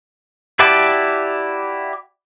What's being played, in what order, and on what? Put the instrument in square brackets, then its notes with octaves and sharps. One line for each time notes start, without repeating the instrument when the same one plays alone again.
[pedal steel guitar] E4 F#4 G4 D5 A5